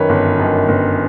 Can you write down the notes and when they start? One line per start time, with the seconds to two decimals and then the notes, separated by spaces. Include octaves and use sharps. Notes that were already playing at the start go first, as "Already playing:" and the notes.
Already playing: F#2 D#3 B4 C#5
0.09 G1
0.39 F#2 D#3
0.68 G1